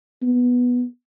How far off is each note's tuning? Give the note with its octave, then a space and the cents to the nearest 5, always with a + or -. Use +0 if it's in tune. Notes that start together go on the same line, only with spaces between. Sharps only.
B3 -5